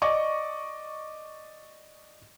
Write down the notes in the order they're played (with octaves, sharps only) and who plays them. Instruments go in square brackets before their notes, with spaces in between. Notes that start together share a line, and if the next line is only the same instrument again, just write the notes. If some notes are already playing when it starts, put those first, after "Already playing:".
[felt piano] D5 D#5 C#6 D6